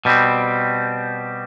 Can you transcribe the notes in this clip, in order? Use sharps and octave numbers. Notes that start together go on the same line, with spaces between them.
B2 G3 C4